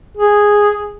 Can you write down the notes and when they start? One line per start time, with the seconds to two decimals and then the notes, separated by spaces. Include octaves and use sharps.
0.17 G#4